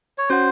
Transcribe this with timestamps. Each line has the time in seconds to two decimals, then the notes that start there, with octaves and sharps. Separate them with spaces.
0.18 C#5
0.29 C#4 F#4 C5 C#5 F#5